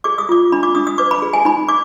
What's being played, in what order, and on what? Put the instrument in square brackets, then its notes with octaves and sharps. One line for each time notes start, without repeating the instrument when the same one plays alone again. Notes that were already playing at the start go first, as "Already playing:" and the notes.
[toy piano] G#4 D6
D#6
F4 D6
D4 B5
D6
D4 D#6
D#6
B4 D6
B5
G#4
G#5
D#4 B5
D6